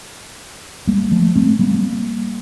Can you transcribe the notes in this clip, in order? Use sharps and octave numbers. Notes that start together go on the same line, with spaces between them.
G3 A#3
F3 A3
A3 C4
G3 A#3